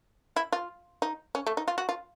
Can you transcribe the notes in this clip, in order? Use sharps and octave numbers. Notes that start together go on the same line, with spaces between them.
E4
F4
D#4
C#4
A3
D#4
F4
F#4
F4